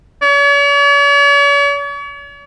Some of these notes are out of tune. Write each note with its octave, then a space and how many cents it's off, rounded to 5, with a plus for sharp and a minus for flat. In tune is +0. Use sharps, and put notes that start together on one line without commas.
C#5 +45